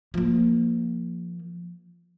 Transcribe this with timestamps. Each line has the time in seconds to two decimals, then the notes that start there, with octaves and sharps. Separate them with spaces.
0.14 F3 A#3